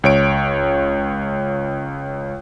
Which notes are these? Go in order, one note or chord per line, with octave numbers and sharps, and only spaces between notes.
C#2 C#5 D7